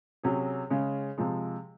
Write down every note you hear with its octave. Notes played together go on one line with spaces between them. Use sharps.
C3 F#3 C#4 G#4
C#3 G#3 C#4
C3 F3 G#3